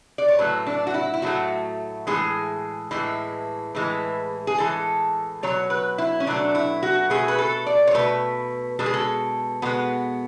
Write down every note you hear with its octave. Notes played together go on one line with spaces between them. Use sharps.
D5
C#5
A2 F#3 A3 B4
D4
F#4
E4
E4
A2 F#3 A3 F#4
A2 E3 G#3 G#4
A2 E3 G#3
A2 E3 G#3
G#4
A2 E3 G#3 A4
B2 F#3 A3 C#5
B4
E4
C#4
B2 F#3 A3 D4
E4
F#4
B2 A3 G#4
B4
A4
D5
C#5
B2 A3 B4
B2 G#3 A4
G#4
A4
B2 G#3 B3